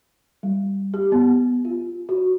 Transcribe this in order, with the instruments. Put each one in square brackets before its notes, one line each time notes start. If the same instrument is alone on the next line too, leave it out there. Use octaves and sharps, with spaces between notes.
[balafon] G3
G4
B3
F4
F#4